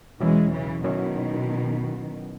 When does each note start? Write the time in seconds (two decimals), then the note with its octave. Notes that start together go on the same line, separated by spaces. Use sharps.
0.20 E2 B2 E3 F#3 G#3 C#4 E4
0.52 C#3 E3
0.84 B2 D#3 F#3 C#4 E4